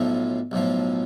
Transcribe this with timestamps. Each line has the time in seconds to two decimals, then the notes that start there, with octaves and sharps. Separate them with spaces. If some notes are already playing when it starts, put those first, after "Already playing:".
Already playing: B1 A2 F3
0.51 B1 A2 F3